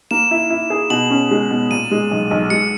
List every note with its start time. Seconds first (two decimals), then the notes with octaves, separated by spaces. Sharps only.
0.11 A#3 E7
0.31 E4
0.50 E4
0.70 G#4
0.90 B2 F#7
1.10 C#4
1.31 G#3
1.51 B2
1.71 A#2 D#7
1.91 G#3
2.11 B1
2.31 B1
2.50 G#3 C#7